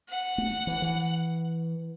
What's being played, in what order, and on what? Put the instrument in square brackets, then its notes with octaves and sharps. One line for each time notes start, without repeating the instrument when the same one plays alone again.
[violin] F#5
[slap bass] A3
E3
E3